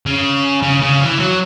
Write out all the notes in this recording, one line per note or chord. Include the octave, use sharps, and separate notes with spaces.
C#3
C#3
C#3
E3
F#3